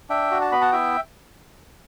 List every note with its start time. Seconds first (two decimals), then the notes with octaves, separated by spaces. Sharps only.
0.09 D4 E5 G5
0.31 F#4
0.41 A5
0.52 B3 B5
0.61 F#5 A5
0.72 E4 E5 G5